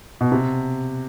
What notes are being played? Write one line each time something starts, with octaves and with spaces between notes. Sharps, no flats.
B2
C3